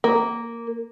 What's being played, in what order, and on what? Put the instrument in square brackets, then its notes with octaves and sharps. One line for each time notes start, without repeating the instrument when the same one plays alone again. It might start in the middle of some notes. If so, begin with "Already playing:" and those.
[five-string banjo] A#3